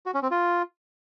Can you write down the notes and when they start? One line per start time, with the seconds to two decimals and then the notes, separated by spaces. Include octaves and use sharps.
0.06 F#4
0.14 C#4
0.23 C4
0.31 F4